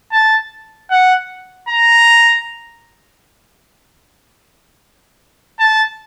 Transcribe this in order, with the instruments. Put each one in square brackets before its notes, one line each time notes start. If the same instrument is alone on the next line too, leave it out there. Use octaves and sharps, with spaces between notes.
[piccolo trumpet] A5
F#5
A#5
A5